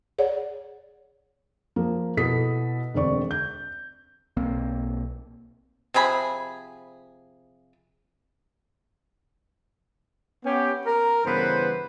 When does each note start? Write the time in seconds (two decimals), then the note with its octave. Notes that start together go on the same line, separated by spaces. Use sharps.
0.18 G#4 C#5 D5 F#5
1.76 F3 A#3
2.17 B2 B3 E4 A4 D#6 B6
2.94 E1 D2 C4 D5 C#6
3.31 G6
4.37 B1 A#3 C4
5.94 C3 F3 G#4 B5
10.45 B3 C#4 G4
10.86 A#4
11.25 G2 C#3 E3 B3 B4 C5